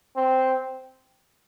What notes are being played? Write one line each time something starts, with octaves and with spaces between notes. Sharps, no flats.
C4